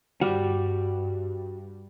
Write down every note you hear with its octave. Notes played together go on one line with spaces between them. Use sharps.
G2 G3 F#4